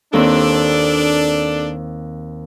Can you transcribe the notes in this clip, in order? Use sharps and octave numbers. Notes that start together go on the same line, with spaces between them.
D#2 C4 D4 A4